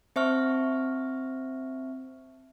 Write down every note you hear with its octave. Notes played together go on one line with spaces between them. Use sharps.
C4 C5 E5 A5 C#6 F6